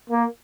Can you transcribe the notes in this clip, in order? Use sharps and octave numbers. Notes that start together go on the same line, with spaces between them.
A#3